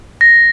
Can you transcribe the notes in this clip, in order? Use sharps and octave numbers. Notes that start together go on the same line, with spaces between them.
A#6